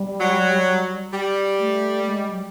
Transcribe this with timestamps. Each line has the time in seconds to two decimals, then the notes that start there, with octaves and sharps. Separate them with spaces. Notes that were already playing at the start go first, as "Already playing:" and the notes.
Already playing: G3
0.20 F#3
1.13 G3
1.59 A3
2.06 G#3
2.30 F#3